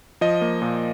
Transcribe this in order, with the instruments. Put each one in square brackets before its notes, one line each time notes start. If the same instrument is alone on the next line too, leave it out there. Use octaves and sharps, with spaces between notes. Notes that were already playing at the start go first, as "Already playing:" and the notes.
[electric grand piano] F3 D#5
A#3
A#2